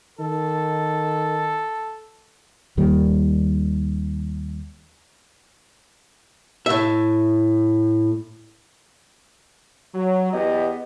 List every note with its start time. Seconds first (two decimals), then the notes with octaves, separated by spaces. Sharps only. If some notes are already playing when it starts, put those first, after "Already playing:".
0.19 D#3 A4
2.77 D#2 D#3 G3 A#3
6.66 A2 E5
9.95 F#3
10.33 E2 B3 G4 D#5